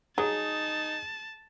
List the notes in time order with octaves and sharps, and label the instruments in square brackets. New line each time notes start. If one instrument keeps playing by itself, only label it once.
[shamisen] F#3 [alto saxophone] D#4 [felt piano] G#4 D#6 [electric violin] A5